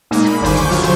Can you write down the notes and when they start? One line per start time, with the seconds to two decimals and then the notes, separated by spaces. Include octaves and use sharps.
0.11 A#2 G#3 A#3 D#4
0.25 B5
0.41 G1 D#2 D4 C5 G#5 B6
0.55 C#6 D6 G6
0.69 A#1 D3 F#3 F4 C#5 F6
0.82 C#3 C5 G#6